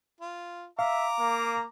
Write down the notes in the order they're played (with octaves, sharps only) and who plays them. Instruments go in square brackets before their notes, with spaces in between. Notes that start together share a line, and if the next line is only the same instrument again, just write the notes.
[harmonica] F4
[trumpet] E5 [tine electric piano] F5 [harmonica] A#5 D6
[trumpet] A#3